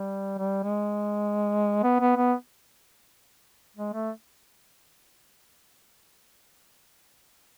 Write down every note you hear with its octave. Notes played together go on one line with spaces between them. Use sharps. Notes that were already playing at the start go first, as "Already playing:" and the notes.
Already playing: G3
G3
G#3
B3
B3
B3
G#3
A3